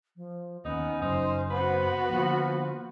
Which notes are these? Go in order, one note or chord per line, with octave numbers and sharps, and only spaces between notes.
F3
D#2 B3 C#4 D#4
F#1 F#2 D#4 C5
B3 F#4 B4 C5
D3 F3 A#3